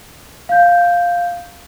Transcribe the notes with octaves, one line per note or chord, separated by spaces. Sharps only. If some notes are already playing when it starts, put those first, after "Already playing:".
F5 G6